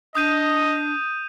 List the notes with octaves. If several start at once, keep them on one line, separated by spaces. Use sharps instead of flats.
D4 D#5 D#6 G6 D#7